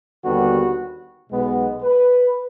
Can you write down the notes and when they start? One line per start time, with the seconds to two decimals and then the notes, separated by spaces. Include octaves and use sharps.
0.24 D#2 D3 G3 B3 F#4
1.29 B1 B2 G#3 B3
1.82 B4